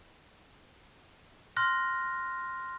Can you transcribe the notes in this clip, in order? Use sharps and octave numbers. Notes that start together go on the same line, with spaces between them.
C6 F6 F#6 A#6